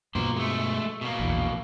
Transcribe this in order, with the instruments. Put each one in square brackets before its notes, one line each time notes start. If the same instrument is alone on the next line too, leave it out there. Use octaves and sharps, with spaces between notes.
[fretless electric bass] G2 B2 F3 [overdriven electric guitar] A#3 C5
[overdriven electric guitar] G#3 A3
B2 A#3
[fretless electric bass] A#1 E2